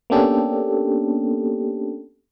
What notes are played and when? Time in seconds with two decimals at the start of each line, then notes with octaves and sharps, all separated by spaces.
0.10 A#3 B3 C#4 D4 G4 A4